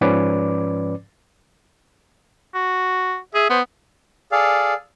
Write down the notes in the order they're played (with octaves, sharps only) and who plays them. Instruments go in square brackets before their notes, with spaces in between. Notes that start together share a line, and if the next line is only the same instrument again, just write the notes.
[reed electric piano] G#2 F3 C#4 B4 D5 D6
[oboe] F#4
[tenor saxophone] G#4 [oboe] E5
[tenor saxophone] B3 [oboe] C5
[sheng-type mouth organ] G#4 A4 D5 F5